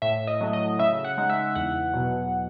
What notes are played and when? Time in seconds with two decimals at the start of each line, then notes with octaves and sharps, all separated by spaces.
0.02 A2 E5
0.27 D#5
0.41 F#3 A3
0.53 D#5
0.79 C#3 E5
1.04 F#5
1.18 G#3 D#4
1.30 E5
1.55 E2 F#5
1.94 B2 F#3